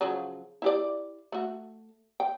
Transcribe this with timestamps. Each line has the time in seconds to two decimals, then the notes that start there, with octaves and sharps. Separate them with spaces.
0.01 C#3 F3 F#3
0.62 E4 G4 D5
1.32 A3 F#4
2.20 G5